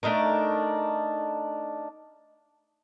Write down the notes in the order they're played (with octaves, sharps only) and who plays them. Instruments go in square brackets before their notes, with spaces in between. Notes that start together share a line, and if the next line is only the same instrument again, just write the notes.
[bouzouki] A3 D4 D#4 A#4